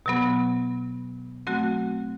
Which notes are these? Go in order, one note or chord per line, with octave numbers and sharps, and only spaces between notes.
B2 F#3 B3
F#3 A3 C4 F#4